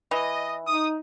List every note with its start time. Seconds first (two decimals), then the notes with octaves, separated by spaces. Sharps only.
0.11 E3 D#5
0.66 D#4 D#6